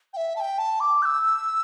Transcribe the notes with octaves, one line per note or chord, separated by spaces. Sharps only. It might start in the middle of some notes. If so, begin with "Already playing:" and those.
G5
E5
A5
G5
A5
D6
G6
E6